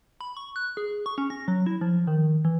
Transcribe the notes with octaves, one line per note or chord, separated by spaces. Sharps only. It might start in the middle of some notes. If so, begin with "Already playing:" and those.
B5
C#6
F#6
G#4
C#6
C#4
A#6
F#3
E4
F3
D#3
E3